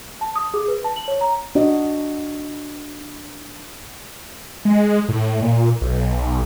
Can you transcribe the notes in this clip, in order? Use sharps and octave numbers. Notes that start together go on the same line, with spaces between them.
A5
D#6
G#4
B4
A5
F#7
C#5
A#5
D4 F#4 D#5
G#3
A2
A#2
B1